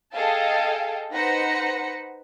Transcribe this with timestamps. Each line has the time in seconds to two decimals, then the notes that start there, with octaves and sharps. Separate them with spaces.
0.14 G#4 A4 D#5 F5 G5 A5
1.12 D#4 B4 C5 F#5 A#6 C#7